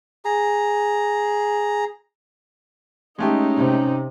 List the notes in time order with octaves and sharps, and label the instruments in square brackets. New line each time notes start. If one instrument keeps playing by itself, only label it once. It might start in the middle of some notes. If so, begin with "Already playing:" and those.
[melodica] G#4 A#5
[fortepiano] G#3 A3 G4 [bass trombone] C#4 [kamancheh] D#4
[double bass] C3